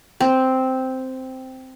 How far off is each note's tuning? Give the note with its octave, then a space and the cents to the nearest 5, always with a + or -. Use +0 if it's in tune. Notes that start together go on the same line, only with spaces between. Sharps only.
C4 -5